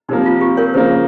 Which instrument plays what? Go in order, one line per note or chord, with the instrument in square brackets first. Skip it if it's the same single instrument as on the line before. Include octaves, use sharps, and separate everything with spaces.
[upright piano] C3 F3 A#3 [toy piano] D#4
[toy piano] F4
G4
A#4 C#5
[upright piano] C#3 F3 A#3 [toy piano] C5